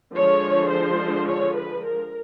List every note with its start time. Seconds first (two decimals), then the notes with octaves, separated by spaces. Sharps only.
0.15 D3 F3 G#3 C#5
0.71 C5
1.27 C#5
1.56 B4
1.83 A#4